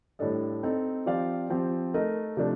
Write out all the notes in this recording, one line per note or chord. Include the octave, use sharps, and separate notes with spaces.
A2 G3 D4 A4 D#5
C4 D#4 A4
F3 C4 G4 D5 F5
F3 C4 G4
A3 D#4 A#4 D#5
C3 F3 A3 D4